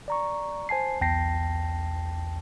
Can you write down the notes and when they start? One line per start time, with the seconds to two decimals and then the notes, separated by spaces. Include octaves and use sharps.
0.08 D5 A#5 C#6
0.69 C5 G#5 A5 C7
1.01 B1 E2 G5 A5 A#6 C7